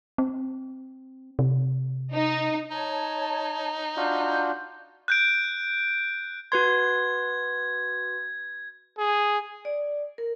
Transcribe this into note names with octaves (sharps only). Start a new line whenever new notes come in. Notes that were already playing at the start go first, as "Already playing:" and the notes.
C4
C3
D#4
D#4 C#5 A5
D4 F4 F#4 G6
F#6 G6 D7
F#4 B4 C6 G#6
G#4
D5
A#4